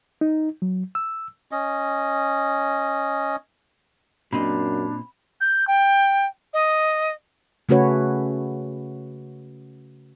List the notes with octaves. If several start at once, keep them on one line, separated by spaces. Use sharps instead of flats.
D#4
F#3
E6
C#4 D#5
F#2 A#2 C4 D4 D#5 B5
G6
G5
D#5
C#3 A3 C#4 F#4 B4 C#5